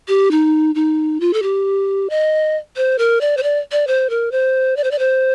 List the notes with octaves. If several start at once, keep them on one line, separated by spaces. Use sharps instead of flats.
G4
D#4
D#4
F4
A4
G4
D#5
C5
A#4
D5
C5
D5
D5
C5
A#4
C5
D5
C5
D5
C5